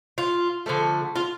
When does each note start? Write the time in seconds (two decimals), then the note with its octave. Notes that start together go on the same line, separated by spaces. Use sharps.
0.18 F4
0.66 D3 F3 A3
1.15 F4